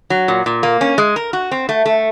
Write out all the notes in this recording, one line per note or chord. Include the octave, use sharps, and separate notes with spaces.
F#3
A#2
A#2
A#3
C#4
G#3
A#4
F#4
C4
A3
A3